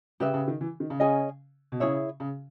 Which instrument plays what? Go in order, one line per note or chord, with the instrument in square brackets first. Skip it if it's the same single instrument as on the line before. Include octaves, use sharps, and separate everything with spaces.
[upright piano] C#3 [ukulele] G4 B4 E5
[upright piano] C#3
D#3
E3
D#3
C#3
[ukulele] C#4 G#4 D#5 G#5
[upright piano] B2
[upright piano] C#3 [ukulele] E4 G#4 C#5 E5
[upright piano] C#3